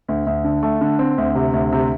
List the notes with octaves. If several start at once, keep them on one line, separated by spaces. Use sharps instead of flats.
D2
D2
D3
A3
D3
C4
D2
C3
D2
C3